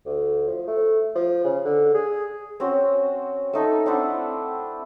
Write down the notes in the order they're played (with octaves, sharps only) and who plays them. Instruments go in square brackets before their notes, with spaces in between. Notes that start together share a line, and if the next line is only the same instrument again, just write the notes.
[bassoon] D2
F3
A3
F3
C#3
D3
G#4
[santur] C4 C#4 F#4 C5
A3 D#4 A4
C4 D4 E4 F#5